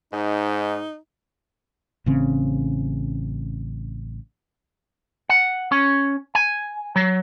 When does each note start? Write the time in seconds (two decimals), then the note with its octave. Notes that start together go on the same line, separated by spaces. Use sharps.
0.13 G#2 D#4
2.06 A1 C#3 C4
5.29 F#5
5.72 C#4
6.35 G#5
6.96 F#3